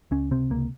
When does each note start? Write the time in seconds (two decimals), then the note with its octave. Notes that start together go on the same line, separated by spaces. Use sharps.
0.11 C#2 C#4
0.31 C3 C4
0.50 C#2 A#3